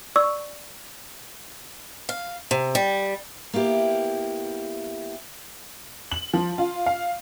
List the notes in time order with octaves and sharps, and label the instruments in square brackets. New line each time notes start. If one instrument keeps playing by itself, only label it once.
[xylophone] D5 C#6 E6
[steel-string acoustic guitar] F5
C3
G3
A#3 B3 E4 G4
[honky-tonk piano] F#7
F3
F4
F5